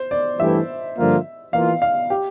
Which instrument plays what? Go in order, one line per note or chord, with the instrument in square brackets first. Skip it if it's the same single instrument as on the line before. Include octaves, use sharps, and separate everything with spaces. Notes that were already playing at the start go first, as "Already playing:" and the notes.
Already playing: [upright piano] C5
D5
[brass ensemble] G2 E3 A3 E4 G4 [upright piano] E5
[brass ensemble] G2 D3 F3 A#3 F4
[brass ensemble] E3 A#3 F4 [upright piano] F5
[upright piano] F5
G4